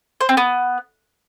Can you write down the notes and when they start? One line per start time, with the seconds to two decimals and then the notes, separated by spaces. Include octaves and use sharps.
0.21 C5
0.29 C4
0.37 B3